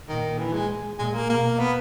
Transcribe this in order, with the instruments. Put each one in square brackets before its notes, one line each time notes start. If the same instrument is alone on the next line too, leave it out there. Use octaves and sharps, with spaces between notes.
[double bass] A#2 [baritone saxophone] D#3
[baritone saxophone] E3
G#3
[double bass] A#2 [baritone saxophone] G#3
[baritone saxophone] A#3
[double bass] B2 [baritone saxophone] A#3
[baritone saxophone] B3